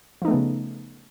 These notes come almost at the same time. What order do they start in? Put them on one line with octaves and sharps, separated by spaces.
F3 D#4 A3 B3 C#3